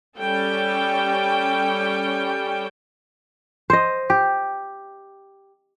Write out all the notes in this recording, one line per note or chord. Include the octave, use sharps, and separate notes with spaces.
G3 C#4 A4 G5
C5 D#5
G4